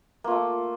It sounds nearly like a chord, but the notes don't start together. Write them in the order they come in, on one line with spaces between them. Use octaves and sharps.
A#3 F4 A3